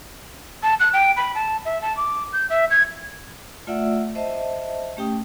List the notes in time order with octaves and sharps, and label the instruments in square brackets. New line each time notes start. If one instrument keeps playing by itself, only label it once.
[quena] A5
F#6
G5
B5
A5
E5
A5
D6
G6
E5
G#6
[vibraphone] A3 F4 D5 E5 F#5 E6
C5 D#5 E5 A5
A3 C#4 G4 G5 D#6